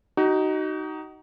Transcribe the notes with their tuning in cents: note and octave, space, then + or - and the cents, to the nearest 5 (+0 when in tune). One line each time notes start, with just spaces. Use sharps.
D#4 +0 F#4 +35